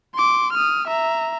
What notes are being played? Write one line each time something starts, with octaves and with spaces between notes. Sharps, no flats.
C6 D6
D#6 F6
E5 A#5